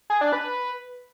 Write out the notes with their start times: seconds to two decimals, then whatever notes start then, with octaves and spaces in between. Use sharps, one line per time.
0.10 G#4
0.21 D4
0.32 B4